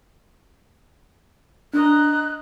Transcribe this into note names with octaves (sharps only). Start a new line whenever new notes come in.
D4 D#5 A#5 F#6